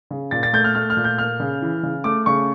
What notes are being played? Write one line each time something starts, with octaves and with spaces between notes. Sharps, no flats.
C#3
A#2 A6
A6
A3 G6
F6
A3 F6
F6
A#2
G6
A#3 F6
C#3
E3
C#3
A3 D6
C#3 C#6